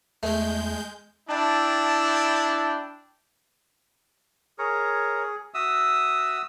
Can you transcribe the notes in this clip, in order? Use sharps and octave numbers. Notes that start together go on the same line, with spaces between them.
E2 G#3 A3 G6
D4 E4 G5 A5
G#4 A#4 C#5
F#4 E5 D#6 E6